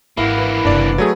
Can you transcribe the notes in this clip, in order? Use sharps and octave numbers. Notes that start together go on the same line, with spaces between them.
G#1 E3 A#3 E4 F5 F#5
B4
F#1 C3 D4 D5
F#3 A3 G#4